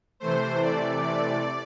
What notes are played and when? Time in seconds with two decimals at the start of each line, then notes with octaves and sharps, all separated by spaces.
0.20 C3 E3 A3 C5
0.61 D5
1.03 D5